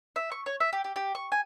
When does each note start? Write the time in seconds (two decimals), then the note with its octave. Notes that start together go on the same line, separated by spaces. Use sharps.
0.16 E5
0.32 C#6
0.46 C#5
0.60 E5
0.73 G4
0.84 G4
0.96 G4
1.15 C#6
1.32 G#5